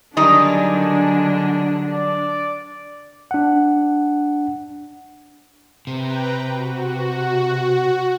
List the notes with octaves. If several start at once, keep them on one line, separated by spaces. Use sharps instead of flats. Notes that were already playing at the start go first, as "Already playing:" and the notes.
D3 D#3 F#3 G3 D4 D#4 G#5
D5
D4 F#5
C3 B4 G5 A#5
F#4